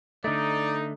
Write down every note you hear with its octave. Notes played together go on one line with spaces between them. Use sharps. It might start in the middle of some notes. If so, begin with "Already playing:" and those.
D3 A3 D#4 D5